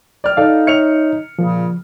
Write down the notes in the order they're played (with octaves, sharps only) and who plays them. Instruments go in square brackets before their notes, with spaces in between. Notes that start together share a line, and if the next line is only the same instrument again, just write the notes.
[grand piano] D5 F6
[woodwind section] D#4 [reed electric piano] A4 F5 [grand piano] D5
[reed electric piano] C#5 E5 F6 [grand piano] C#7 F7
[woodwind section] A#2 C#3 [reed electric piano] F3